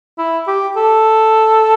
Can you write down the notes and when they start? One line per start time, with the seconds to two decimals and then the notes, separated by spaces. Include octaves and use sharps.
0.18 E4
0.47 G4
0.77 A4